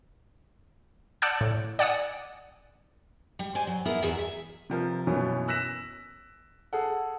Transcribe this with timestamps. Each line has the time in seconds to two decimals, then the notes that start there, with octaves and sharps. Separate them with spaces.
1.22 D5 F#5 A5 E6 F#6 G6
1.41 A2
1.79 D5 F#5 G#5 D#6
3.39 G3
3.55 C5 D5 G#5
3.67 F#3
3.85 B3 E4 G#4 A#4
4.02 E2 E3 B3 G#4 E5 A#5
4.18 E5
4.70 C3 F3 A#4
5.07 F#2 B2 E3 A#3 B3 C#4
5.48 E6 F#6 A#6 B6 E7
6.73 G#4 A4 F#5